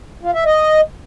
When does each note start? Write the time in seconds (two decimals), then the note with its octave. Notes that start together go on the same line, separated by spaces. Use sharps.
0.23 F4
0.34 E5
0.45 D#5